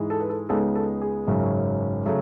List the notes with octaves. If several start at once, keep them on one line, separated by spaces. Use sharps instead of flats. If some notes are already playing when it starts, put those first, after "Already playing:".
Already playing: G#2 E3 G#3
A4
B4
A4
C#2 C#3 G#3 B3 D#4 A4
A4
G#4
G#1 F#2 C#3 F#3 C#4
C#3 F#3 A3